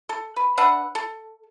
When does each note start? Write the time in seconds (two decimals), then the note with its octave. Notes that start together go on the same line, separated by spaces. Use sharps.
0.09 A4
0.36 B4
0.58 D4 B4 E5 F#5
0.95 A4